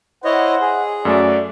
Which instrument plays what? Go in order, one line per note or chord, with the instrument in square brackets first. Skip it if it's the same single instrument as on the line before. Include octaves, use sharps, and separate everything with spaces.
[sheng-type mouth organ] E4 C#5 D#5 [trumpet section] C5 F#5
[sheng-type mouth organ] G#4
[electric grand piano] F#2 A3 E5 [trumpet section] F#4 D5